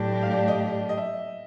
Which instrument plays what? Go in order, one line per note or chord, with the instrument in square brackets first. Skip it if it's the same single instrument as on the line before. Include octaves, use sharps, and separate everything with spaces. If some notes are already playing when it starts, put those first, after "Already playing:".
Already playing: [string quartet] A2 F#3 A3 D4 G4
[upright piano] F5
D5
D#5
D#5
E5